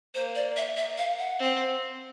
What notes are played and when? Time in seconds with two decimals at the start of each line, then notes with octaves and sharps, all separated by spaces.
0.15 A#3 C5
0.35 D5
0.57 E5
0.77 E5
0.98 F5
1.19 F#5
1.39 C4